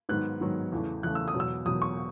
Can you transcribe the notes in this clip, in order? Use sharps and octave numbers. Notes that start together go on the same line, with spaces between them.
G#2 D#3 F#3 B3 F#6
G#2 D#3 F#3 B3
E2 C#3 E3 A3
E2 C#3 E3 A3 F#6
E6
D#6
E2 B2 F#3
E6
E2 B2 F#3 D#6
C#6